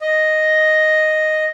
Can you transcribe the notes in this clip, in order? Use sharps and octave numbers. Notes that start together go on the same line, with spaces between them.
D#5